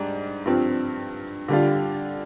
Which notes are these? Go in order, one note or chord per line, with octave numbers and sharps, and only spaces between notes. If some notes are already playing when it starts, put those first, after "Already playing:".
Already playing: G#2 G3 D4
G2 F3 C4
D3 G3 D4 F4